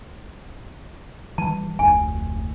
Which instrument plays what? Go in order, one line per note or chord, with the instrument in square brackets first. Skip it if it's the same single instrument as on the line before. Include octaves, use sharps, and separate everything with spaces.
[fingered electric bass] E3 G3 [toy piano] A5
[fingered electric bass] F1 D2 A2 [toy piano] G#5